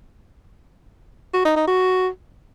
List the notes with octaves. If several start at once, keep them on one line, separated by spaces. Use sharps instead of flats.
F#4
D#4
D#4
F#4